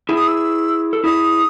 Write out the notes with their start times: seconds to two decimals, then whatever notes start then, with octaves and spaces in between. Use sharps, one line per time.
0.09 E4 G#4
0.16 D#6
0.28 E6
0.93 A4
1.04 E4 G#4 D#6